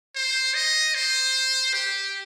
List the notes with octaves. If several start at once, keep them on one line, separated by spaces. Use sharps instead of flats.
C5
D#5
C5
G4